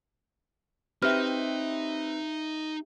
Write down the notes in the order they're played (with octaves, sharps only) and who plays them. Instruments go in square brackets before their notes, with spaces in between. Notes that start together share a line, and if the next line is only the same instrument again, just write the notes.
[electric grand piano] C4 B4 [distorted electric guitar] D#4 [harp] G4 E5 [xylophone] F6